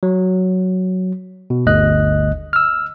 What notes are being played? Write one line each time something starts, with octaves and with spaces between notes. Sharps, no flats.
F#3
B2
G1 D2 D#5 F#6
E6 F6